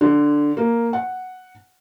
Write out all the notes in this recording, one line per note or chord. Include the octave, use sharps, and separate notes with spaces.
D3
A#3
F#5